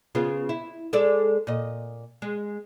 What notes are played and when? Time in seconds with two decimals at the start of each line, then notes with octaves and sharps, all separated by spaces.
0.15 C#3 B3 F4
0.49 E4
0.93 G#3 A4 D5
1.47 A#2 D#5
2.22 G#3